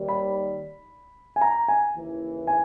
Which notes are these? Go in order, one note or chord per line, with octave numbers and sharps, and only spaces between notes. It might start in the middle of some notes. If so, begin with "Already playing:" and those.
Already playing: D#2 D#3 G3
B5
G#5
A#5
G#5
D#2 C#3 E3
G#5